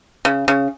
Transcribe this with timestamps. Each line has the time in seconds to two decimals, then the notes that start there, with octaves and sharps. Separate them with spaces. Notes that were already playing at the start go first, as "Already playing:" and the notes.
0.25 C#3
0.48 C#3